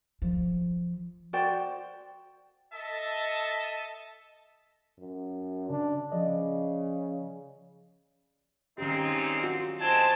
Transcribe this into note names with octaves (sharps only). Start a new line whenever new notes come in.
F3
F#4 C5 D5 G5
A4 D#5 E5 A5
F#2
C#3 D4
C#3 F3 D5 D#5
A#2 D#3 G#3 C4 C#4 D#4 G4
F4 F#4
G#3 A3 C4 C5 G#5 A5